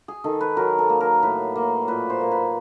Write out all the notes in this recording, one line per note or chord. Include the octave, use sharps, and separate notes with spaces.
G#4
D#3 A4
B4
F#3 A#4
A4
A#3
A#4
A2 B4
A#3
A#2 B4
C5
A#3
B4